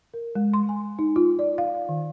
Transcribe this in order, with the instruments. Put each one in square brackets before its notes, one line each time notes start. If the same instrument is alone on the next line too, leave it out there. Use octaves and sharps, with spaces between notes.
[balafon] A#4
G#3
C6
G#5
D#4
F4
D5
F5
D#3